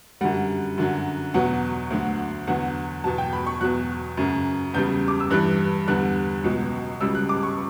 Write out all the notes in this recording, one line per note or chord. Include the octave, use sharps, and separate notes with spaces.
F#2 D3 G3 F#5
F#2 D3 F#3
E2 B2 F#3 F#5
D2 D3 F#3
E2 D3 F#3 F#5
E2 B2 F#3 A5
G5
B5
C#6
E2 B2 F#3 F#6
F#2 C#3 F#3
E2 C#3 G3 G6
D6
E6
G2 E3 G3 F#6
E2 D3 G3 F#6
C#2 B2 F#3
C#2 C#3 G3 E6
F#6
D6
C#6